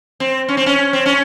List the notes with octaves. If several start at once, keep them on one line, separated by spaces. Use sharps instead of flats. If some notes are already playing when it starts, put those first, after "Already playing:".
C4
C#4
C4
C#4
C4
C#4